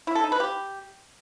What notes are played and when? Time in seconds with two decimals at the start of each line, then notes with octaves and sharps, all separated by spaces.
0.07 E4
0.15 A4
0.24 D#4
0.32 B4
0.40 G4